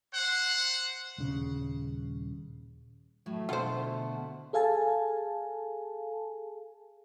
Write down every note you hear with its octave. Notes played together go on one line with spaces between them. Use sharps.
C5 F#5
D#1 C#3
A2 F#3 A3
B2 D3 F4 C5 F#5
G#4 A4 F5 G#5 A5